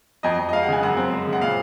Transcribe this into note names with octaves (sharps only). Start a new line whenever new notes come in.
F2 D#5
F2
D#5
G#3 F5
F#5
C#3 G#5
F#2 F#5
C4
G#3
C#3
F#5
A#2 F5